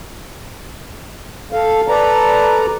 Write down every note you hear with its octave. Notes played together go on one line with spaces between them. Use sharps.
A4 F5
A4 B4 D5 A#5